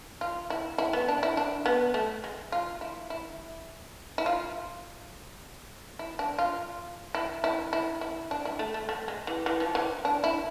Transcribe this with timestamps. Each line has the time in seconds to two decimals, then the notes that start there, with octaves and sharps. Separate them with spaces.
0.21 F4
0.50 E4
0.78 E4
0.93 B3
1.08 D4
1.23 E4
1.37 D4
1.66 B3
1.94 A3
2.24 G#3
2.52 F4
2.81 E4
3.10 E4
4.18 E4
4.26 F4
5.99 E4
6.19 D4
6.39 F4
7.15 E4
7.44 E4
7.73 E4
8.01 E4
8.31 D4
8.45 E4
8.59 A3
8.74 A3
8.89 A3
9.08 G#3
9.27 E3
9.46 E3
9.60 F3
9.75 E3
10.05 D4
10.24 E4